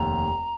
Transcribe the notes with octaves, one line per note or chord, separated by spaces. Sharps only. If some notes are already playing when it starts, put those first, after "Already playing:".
Already playing: F1 D#2 A#5